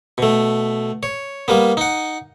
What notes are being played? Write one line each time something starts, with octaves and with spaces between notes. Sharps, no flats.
B2 A3
C#5
G3 A#3 B3
D#4 F#5